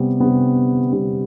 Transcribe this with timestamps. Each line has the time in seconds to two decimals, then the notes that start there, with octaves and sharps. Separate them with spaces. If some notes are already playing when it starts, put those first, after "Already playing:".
Already playing: C3 G3 B3
0.20 C3 G3 B3
0.92 C3 G3 B3